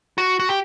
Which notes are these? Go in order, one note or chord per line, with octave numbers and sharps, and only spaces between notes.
F#4
F#4
G4